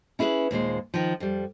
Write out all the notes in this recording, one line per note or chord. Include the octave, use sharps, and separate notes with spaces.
C#4 E4 G#4 A#4 B4
D#2 A#2 G#3 C5
D#3 F3
F2 G3